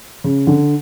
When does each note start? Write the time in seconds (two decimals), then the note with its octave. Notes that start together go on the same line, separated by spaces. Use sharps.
0.24 C#3
0.47 D3